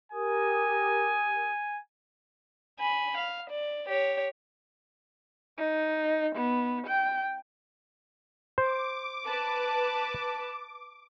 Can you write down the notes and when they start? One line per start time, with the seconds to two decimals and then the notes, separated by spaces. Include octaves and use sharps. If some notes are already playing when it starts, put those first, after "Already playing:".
0.12 G4 A#4 G#5 D#6
2.79 G#5 B5
3.17 F5
3.50 D5
3.89 G4 C#5
5.58 D#4
6.36 B3
6.87 G5
8.58 C5 D6
9.25 B4 A5